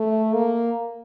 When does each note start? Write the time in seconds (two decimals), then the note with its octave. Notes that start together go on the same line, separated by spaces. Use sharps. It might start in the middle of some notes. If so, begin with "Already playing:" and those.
Already playing: A3
0.33 A#3